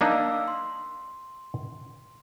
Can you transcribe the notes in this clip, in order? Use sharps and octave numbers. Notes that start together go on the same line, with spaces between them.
A#3 D4 D#4 F5 E6
C6